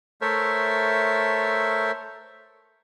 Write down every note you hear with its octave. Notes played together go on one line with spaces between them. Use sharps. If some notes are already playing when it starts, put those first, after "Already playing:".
A3 A4 A#4 C5 C#5 E5